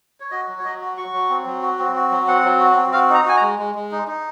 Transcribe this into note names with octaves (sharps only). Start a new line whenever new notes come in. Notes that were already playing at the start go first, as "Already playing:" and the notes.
C#5
F#4 D#5
F#3
C#5
F#3 D#5
F#4
F#4 C#6
F#3
C4
F#3
F#4
C4
F#4
F#3
C4 F#5
F#3
F#4
C4
F#4 F5
D#4 A#5
F#4 G#5
A#5
G#3
G#3
G#3
D#4
D#4